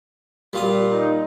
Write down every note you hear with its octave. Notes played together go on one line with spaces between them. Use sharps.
A#2 G3 F4 D#6
D#4